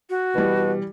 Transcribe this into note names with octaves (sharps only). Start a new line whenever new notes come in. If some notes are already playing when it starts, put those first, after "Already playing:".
F#4
B2 E3 G3